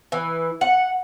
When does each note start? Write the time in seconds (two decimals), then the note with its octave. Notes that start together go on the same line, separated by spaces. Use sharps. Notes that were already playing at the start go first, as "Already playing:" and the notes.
0.12 E3
0.61 F#5